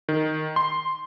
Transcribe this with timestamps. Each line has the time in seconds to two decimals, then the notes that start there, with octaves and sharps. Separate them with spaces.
0.09 D#3
0.56 C6